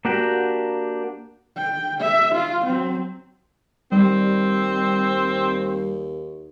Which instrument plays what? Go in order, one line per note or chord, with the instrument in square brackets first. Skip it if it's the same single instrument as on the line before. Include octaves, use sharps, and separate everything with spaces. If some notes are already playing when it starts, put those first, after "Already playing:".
[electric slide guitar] A#3 D4 F#4 G4
[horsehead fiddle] G5
E5
F4
F#3 C4
[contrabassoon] D#2 [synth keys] G3 [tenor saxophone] C4